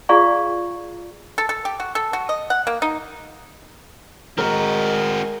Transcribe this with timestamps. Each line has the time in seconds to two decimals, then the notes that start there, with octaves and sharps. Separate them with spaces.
0.09 F4 G#4 D5 F5 A#5 C#6
1.38 A4
1.49 A4
1.65 G4
1.80 F#4
1.95 A4
2.13 F#4
2.29 D#5
2.50 F#5
2.67 A#3
2.82 D#4
4.38 G#3 C4 F#4 A#4